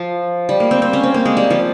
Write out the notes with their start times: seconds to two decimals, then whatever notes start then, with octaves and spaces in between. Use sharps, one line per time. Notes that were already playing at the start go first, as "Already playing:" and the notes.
Already playing: F3
0.49 G3
0.60 A#3
0.71 C4
0.82 C4
0.93 C#4
1.03 C4
1.14 A#3
1.25 G#3
1.37 G3
1.50 F3